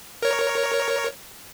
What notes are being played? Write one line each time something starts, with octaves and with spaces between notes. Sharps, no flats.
A#4 C#5